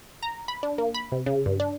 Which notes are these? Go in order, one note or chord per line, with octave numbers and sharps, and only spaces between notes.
A#5
B5
D4
A#3
B5
C3
C#3
G2
D4